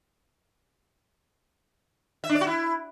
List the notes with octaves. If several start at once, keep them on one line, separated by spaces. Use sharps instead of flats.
E5
D4
D5
F#4
E4